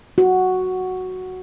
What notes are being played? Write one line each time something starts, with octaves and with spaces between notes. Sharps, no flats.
F#4